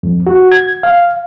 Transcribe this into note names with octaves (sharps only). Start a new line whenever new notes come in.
F2
F#4
G#6
F5